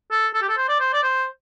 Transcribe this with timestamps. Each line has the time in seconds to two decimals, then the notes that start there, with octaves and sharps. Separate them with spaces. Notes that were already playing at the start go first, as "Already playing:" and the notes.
0.11 A4
0.34 A4
0.42 G4
0.49 A4
0.57 C5
0.68 D5
0.80 C5
0.93 D5
1.03 C5